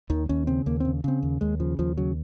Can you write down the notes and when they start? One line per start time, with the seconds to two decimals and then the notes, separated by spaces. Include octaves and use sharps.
0.10 D#2 D#3
0.29 D#2 C#4
0.47 C#3 C4
0.66 D#2 A#3
0.80 C#3 C4
1.04 C#3 C4
1.23 D#2
1.41 D#2 G#3
1.60 C#3 F3
1.79 D#2 F3
1.97 C#3 F#3